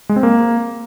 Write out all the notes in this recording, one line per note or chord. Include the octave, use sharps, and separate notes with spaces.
G#3
C4
A#3